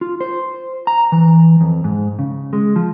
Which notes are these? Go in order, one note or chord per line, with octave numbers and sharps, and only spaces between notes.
F4
C5
A#5
E3
F2
G#2
C#3
G#3
F3